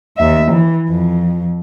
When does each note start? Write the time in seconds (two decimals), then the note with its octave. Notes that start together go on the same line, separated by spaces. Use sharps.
0.17 D#2 E5
0.51 E3
0.90 F2